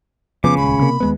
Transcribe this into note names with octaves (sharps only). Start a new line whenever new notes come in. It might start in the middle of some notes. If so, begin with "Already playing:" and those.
F1 C#3 F3 B3 D6
D#1 C#2 B5
C3 A#3
D#2 G#3 B3